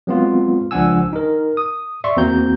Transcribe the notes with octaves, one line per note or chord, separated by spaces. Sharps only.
F#3 G#3 B3 C4 F4
C#2 F3 D4 F#5 G#5 E6
D#4 A#4
D#6
D5 E5 C6 C#6
E2 A#3 C4 F#4 A#5 G6